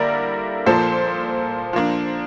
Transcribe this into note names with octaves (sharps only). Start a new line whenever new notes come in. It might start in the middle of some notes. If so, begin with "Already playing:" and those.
Already playing: D3 G3 A#3 E4 A#4 D5
A#2 F3 A#3 A4 C5
F3 A#3 D4